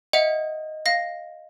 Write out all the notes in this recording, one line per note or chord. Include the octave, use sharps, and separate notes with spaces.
D#5 E5 F#5
F5 A#6